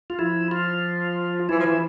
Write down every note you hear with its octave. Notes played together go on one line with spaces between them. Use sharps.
F4
F3 E4
F4
E3 E4
F3
E3